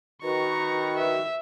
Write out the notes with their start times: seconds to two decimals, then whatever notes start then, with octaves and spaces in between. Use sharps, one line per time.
0.23 D#3 F#4 B4 A#5 C#6
0.97 E5